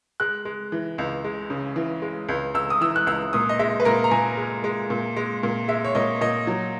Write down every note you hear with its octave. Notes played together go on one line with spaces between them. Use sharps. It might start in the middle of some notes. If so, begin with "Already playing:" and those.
G#3 F#6
G#3
E3
C#2
G#3
C#3
E3
G#3
C#2
C#2 E6
D#6
E3 E6
F#6
C#2 E6
A#2 D#6
D#5
G#3 E5
B4
A#2 A#4
A#5
A#2 G#5
G#3
G#3
A#2
G#3
A#2
G#3 E5
C#5
A#2 D#5
A#2 D#5
F#3